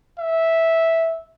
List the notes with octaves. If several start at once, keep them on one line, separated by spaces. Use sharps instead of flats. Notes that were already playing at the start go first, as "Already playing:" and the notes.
E5